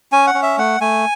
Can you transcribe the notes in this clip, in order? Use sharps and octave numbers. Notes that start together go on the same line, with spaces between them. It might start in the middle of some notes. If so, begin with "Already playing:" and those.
C#4 G#5
F#5
C#4
E5
A3 F#5
A3 G#5